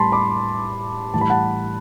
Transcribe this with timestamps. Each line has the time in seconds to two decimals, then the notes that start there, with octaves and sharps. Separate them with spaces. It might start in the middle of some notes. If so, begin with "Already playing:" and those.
Already playing: A2 G3 B3 A5 B5 C6
0.12 B5 D6
1.14 A2 E3 G3 A5
1.21 B5
1.30 F#5 A5